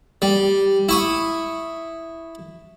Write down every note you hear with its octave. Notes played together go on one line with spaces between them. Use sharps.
G3
E4 C#6 D#6